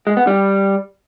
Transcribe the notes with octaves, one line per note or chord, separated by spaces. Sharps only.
G#3
B3
G3